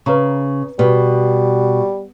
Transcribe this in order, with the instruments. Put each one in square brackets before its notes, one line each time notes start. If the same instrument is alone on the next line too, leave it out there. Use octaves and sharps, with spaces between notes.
[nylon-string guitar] C#3 [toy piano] B4 A#5 C#6
[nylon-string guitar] B2 [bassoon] G3 [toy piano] B4